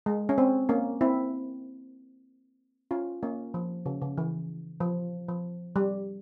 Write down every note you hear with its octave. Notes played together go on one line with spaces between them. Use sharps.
G#3
C#4
C4
A#3 C#4
C4 E4
C#4 F4
A#3 C#4
F3
C#3
C#3
E3
F3
F3
G3